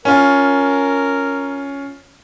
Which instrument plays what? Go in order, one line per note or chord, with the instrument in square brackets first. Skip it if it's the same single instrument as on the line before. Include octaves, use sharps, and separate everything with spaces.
[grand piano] C#4 F4 [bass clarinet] A#4